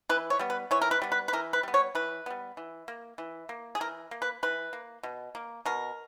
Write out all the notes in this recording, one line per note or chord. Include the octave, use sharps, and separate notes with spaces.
E3 B4
C#5
G3 B3
B4
E3 C#5
A#4
B4
G3 B3
B4
B4
E3 A#4
B4
G3 B3
C#5
E3 B4
G3 B3
E3
A#3
E3
A#3
G#4
E3 A#4
A#3
B4
E3 B4
A#3
B2
A#3
B2 A#4